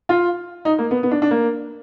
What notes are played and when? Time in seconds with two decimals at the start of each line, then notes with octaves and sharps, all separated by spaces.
0.09 F4
0.65 D#4
0.79 A#3
0.91 B3
1.03 B3
1.11 D4
1.22 D4
1.31 A#3